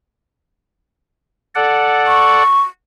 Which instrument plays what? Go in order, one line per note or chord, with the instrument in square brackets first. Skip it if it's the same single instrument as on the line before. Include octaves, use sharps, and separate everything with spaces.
[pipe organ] A4 D5 F#5
[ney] C#6